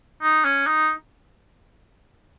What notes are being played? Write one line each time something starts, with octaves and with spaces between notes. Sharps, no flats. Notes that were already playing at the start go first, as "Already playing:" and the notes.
D#4
C#4
D#4